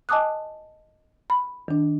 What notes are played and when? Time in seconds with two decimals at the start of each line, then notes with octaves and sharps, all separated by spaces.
0.09 D#5 G#5 A5 D6 D#6 F#6
1.30 B5
1.68 D#3 D4